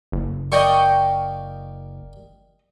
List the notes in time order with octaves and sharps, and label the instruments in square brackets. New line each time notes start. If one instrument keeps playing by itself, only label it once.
[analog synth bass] F#1
[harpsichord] A#4 D5 F5 [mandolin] D#5 G5 C#6